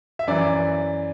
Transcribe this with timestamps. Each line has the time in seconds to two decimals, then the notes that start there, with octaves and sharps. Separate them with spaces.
0.19 E5
0.27 F#2 E3 D5